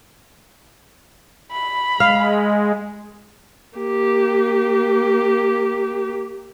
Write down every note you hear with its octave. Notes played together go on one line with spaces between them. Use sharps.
B5
G#3 F5
A#3 G4